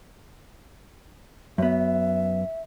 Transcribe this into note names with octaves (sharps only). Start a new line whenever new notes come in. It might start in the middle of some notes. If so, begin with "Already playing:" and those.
F#2 B3 E5